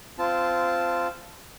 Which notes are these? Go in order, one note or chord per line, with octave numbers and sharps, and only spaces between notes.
C4 F4 A5